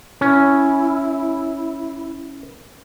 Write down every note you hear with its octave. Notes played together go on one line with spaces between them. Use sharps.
C#4 E4